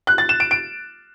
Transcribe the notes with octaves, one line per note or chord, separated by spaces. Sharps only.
F#6
A6
E7
D7
D7